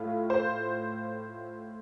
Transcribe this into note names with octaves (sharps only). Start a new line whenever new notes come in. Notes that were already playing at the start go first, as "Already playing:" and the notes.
Already playing: A2 A3 F4
C5